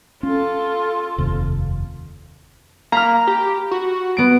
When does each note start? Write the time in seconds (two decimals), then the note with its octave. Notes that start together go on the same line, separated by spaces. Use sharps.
0.23 C#4 F4 A4
1.18 F1 D#2 C3
2.92 A#3 A#5 B5 F6
3.27 G4
3.71 F#4
4.17 B3 D7